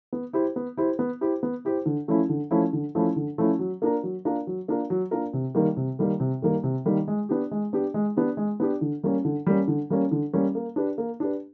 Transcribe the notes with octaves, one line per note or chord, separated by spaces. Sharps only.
B3
E4 G4 C5
B3
E4 G4 C5
B3
E4 G4 C5
B3
E4 G4 C5
D3
F3 A3 C#4 E4
D3
F3 A3 C#4 E4
D3
F3 A3 C#4 E4
D3
F3 A3 C#4 E4
F#3
A#3 D4 F4 A#4
F#3
A#3 D4 F4 A#4
F#3
A#3 D4 F4 A#4
F#3
A#3 D4 F4 A#4
C3
D#3 G3 A#3
C3
D#3 G3 A#3
C3
D#3 G3 A#3
C3
D#3 G3 A#3
G#3
B3 D4 G4
G#3
B3 D4 G4
G#3
B3 D4 G4
G#3
B3 D4 G4
D3
G3 A#3 C#4
D3
G3 A#3 C#4
D3
G3 A#3 C#4
D3
G3 A#3 C#4
A#3
D4 G4 B4
A#3
D4 G4 B4